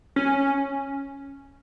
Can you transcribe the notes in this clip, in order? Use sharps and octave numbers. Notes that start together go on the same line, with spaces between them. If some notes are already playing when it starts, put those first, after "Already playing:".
C#4